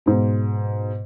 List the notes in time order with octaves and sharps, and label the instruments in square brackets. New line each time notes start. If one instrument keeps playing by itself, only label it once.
[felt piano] G#2 B2